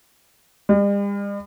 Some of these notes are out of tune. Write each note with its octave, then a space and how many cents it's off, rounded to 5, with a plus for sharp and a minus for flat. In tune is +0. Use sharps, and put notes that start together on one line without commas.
G3 +45